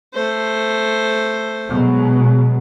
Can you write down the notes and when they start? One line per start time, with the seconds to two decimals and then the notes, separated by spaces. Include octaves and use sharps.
0.14 A3 C5
1.68 B2 F#3 G#3